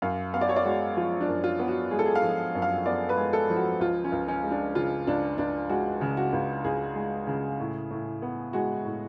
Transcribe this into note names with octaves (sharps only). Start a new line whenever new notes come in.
F#2 F5
B3 F5
D5
C#5
D5
G#3 F#4
F3 F4
D4
F#2
F4
B3
F#4
G#3 G#4
A4
G#4
F5
F3
F#2
F5
B3 D5
B4
G#3
A4
F3
F#4
C#2 F4
C#4
C#2
C#4
G#3
D4
C#3 F4
C#2 D4
C#2 D4
G#3 F#4
C#3
F#4
C#2
C#2 G#4
G#3
C#3
A2
A2
B3
G#3 F#4
A2